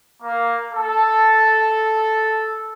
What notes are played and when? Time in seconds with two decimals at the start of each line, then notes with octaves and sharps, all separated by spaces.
0.21 A#3
0.72 A4